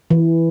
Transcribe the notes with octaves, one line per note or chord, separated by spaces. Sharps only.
E3